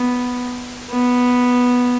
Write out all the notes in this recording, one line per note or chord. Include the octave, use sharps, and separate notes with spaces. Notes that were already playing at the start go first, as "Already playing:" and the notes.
Already playing: B3
B3